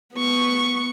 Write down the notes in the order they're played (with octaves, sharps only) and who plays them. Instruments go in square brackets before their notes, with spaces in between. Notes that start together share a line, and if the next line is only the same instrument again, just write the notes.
[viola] B3 C#6